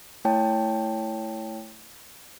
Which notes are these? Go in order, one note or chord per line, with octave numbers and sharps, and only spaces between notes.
A3 E4 C#5 G5 A5